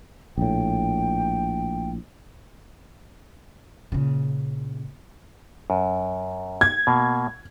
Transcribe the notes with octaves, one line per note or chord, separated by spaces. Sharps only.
A#1 A2 G5
A#2 C#3
F#2
G#6
B2 A#3